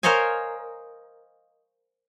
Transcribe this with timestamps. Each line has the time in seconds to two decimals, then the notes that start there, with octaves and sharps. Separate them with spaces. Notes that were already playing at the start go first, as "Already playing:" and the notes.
0.03 A#4 C5 C#5 D#5 F5 G#5